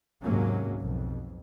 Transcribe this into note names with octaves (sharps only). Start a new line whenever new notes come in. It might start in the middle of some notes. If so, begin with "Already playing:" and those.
D#2 G#2 C3 F#3 A#3 C#4
B1 F2